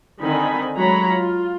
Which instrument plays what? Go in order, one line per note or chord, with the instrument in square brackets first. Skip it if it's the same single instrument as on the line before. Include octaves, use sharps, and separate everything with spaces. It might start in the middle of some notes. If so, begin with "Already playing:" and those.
[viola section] D3 D#3 C4 D#4 G#5 B5
F#3 G#3 A3 C#5 A#5 B5
F4